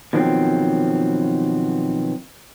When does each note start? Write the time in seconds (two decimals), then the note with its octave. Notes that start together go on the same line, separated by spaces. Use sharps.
0.13 B2 D#3 F3 F#3 A3 C4